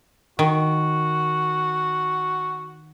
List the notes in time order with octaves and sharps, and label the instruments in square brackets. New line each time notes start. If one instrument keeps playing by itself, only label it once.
[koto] D#3 [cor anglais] F#4